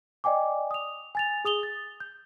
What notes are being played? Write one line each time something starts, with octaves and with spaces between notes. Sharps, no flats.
D5 D#5 G5 G#5 D6
D#6 F7
G#5 A6 F7
G#4 D#6 F7 G7
A6
G6